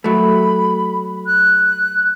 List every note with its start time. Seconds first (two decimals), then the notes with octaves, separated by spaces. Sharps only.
0.04 F#3 A3 B5
1.26 F#6